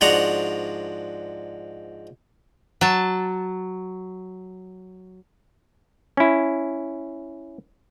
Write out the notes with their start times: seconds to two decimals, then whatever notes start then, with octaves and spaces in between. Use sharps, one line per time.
0.01 G#2 F3 D4 F#4 F#5 A#5
2.81 F#3 A5
6.17 C#4 E4